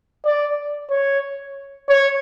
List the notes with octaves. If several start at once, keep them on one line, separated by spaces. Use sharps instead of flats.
D5
C#5
C#5